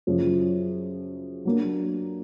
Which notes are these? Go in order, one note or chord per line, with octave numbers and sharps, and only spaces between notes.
F#2 C#3 F3
F#3 A#3 D4